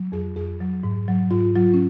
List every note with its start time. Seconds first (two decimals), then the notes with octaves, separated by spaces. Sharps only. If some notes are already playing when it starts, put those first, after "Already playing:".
Already playing: F#3
0.12 F2 G#4
0.36 F2 G#4
0.60 F#3
0.83 G#2
1.08 F#3
1.31 G#2 F4
1.55 F#3 F4
1.74 C#4